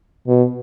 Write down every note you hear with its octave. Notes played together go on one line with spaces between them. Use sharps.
B2